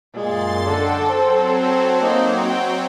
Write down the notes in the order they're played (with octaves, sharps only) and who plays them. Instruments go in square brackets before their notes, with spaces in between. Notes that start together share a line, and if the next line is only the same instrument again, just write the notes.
[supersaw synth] F#2 C6 A6 [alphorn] A#2 [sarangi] G#3
[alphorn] D3 [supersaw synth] F#4 G5 [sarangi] A4
[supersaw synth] F#3 C4 [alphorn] C5
[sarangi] A4
[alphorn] A#3 [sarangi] D#4
[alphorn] F#4 [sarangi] G5